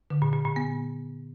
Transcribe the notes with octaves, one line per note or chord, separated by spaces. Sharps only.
D3
A#2
A#2
A#2
B3